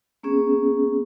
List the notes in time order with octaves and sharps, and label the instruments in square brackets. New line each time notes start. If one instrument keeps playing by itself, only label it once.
[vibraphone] A#3 B3 C#4 G#4